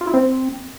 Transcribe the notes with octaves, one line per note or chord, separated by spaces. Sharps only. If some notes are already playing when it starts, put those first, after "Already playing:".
F4
E4
C4